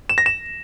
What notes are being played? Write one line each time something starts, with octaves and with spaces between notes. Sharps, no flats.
E7
A#6
E7